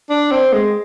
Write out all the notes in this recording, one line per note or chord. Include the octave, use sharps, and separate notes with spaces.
D4
C4
G#3